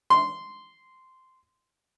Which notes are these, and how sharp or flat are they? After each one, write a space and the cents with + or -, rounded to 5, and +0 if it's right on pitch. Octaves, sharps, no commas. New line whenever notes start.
C6 -10